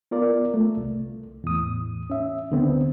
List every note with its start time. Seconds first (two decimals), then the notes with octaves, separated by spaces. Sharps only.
0.11 B3 F4 A#4 D5
0.54 A3
0.77 C2
1.44 E2 A2 D#6
2.10 C#4 E5
2.50 D2 D3 B3 C4